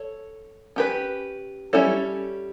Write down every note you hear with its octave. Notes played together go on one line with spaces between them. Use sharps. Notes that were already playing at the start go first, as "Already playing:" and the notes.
Already playing: A4 C#5
C#4 G4 B4
G3 C#4 E4 A4 C#5